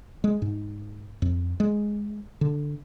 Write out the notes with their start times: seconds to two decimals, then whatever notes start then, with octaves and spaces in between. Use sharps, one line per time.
0.24 G#3
0.42 G#2
1.22 F2
1.60 G#3
2.41 D3